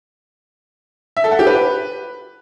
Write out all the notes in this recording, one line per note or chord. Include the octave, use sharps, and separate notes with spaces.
E5
A4
F#5
G4
B4